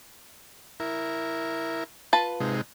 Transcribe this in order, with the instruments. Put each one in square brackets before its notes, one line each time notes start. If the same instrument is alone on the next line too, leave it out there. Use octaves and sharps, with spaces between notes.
[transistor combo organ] E4 A#4
[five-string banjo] F4 B4 A5
[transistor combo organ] C3 G#3 D#4